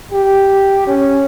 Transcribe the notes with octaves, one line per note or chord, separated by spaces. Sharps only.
G4
C#4